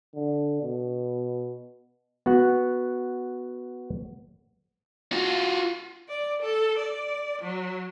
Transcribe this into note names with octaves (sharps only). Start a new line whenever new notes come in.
D3
B2
B3 F#4 F#5
F4 F#4
D5
A4
D5
F#3